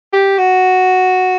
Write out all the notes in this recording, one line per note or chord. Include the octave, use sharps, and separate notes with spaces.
G4
F#4